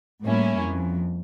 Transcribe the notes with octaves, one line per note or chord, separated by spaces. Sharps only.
A2 G3 A#3 C#4 E4
F2